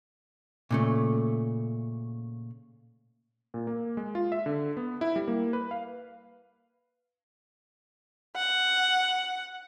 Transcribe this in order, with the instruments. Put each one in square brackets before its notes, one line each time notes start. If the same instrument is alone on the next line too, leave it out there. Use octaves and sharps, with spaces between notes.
[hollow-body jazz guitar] A#2 C#3 A3
[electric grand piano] A#2
A#3
G#3
F4
E5
D3
B3
E4
G3
A#3
B4
F5
[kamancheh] F#5